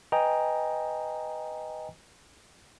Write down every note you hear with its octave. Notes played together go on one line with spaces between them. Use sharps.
B4 D#5 G5 G#5 A#5